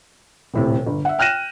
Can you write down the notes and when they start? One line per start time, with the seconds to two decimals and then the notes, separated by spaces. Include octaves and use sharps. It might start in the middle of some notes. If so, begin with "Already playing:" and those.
0.54 D#1 A2 C3
0.87 G1
1.05 E5 F#5
1.19 G5 F6 F#6 A#6 D#7 E7